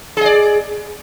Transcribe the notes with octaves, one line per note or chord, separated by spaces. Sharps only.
G#4 D5 D#5